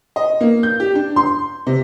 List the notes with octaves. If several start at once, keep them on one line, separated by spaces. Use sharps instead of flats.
D#5
A#3
G6
G4
D4
C6
C3